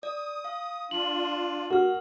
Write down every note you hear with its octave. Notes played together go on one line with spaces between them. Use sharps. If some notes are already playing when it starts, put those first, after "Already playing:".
D5 D#6
F5
D4 F4 F#7
F#4 A#4 F6